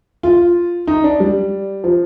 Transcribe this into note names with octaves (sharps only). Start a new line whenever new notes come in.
F4
D#4
D4
G3
F3